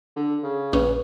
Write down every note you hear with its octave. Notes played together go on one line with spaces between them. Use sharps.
D3
C#3
A#1 C#4 B4